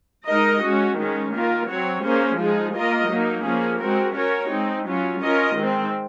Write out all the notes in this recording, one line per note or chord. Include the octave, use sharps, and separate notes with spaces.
G#3 D#4 A#4 D#5
G#3 C#4 F#4
D#3 G#3 C#4
D#3 A#3 F4 A#4
F#3 C4 F#4 C#5
A#3 C#4 G#4 C5
F3 G#3 D#4 G#4
A#3 F4 A#4 D#5
F#3 A#3 D#4
F3 A#3 C#4 G#4
G#3 C4 F#4 A#4
C#4 F#4 A#4 C#5
G#3 C4 D#4
F#3 C#4 F4
C#4 F4 A#4 D#5
D#3 G#3 C4